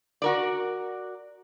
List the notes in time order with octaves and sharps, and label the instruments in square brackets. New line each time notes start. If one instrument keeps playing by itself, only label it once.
[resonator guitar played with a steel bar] F#4 A#4 D5